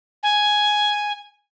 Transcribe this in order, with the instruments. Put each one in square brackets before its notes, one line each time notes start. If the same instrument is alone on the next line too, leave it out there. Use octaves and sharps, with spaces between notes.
[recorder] G#5